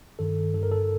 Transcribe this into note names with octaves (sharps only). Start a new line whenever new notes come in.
G2 D#3 A4
G2 D3 A4
A#4
A4